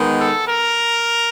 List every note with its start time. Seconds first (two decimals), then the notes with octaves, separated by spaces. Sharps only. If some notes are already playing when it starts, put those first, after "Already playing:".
Already playing: D#3 G#3 B3
0.17 A4
0.46 A#4